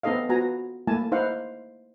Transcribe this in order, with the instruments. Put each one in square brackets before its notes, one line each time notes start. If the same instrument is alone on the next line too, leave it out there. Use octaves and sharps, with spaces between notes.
[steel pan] B3 C4 D#4 A4 D#5 F5
B3 F4 F#4 G#5 A#5
A3 A#3 E4 G#5 A5
D#4 E4 C5 F5 F#5